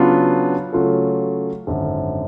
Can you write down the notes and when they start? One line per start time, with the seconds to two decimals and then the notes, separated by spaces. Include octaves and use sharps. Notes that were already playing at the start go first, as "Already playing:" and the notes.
Already playing: C#3 F#3 B3 D4 F4
0.72 C#3 F#3 A3 F4 A4
1.67 G#1 F#2 D3